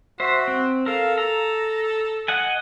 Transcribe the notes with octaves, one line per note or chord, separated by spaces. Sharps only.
F#4 C5 E5
C4
A4 A#4 F5
A4 A#5
D#5 F#5 G#5